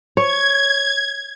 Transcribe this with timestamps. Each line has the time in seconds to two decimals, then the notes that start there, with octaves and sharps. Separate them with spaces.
0.17 C#5 G#6